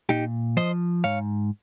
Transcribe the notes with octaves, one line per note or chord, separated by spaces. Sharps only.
A#2 D#4 G4
F3 C5 D#5
G#2 C#5 F5